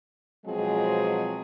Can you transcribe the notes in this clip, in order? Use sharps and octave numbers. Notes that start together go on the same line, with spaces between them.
B2 F3 F#3 G#3 C4 G#4